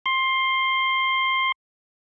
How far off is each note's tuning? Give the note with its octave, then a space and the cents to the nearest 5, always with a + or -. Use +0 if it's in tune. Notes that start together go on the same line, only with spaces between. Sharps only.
C6 +15